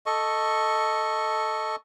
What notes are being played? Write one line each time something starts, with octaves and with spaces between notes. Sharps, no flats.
A4 D#5 C#6